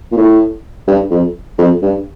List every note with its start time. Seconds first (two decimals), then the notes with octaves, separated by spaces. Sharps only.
0.12 A#2
0.17 A2
0.87 G2
1.11 F2
1.58 F2
1.82 G2